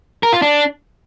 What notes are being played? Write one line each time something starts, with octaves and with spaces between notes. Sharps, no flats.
A#4
F4
D4